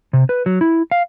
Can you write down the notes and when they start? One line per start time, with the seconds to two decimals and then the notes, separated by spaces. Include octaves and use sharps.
0.13 C3
0.29 B4
0.46 F#3
0.61 E4
0.91 F5